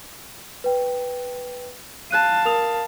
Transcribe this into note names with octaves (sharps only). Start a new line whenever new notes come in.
B4 G5
F5 A5 F#6 D#7
A#4 D#6 F7